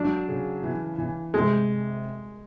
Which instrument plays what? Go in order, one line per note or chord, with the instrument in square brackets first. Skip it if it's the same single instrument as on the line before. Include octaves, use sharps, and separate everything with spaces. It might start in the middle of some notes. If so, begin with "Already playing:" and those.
Already playing: [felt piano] F#3 [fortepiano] D4
[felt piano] C#3
E3
E3
[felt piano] C3 [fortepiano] G#3